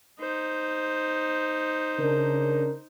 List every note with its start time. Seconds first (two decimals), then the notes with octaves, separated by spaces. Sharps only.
0.20 D#4 C5
1.99 C#3 D4 A#4